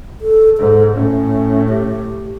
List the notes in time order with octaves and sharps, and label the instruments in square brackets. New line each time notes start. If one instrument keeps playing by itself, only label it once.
[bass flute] A4
[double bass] G#2 [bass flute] A4
[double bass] A2 [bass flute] C#4
[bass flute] G4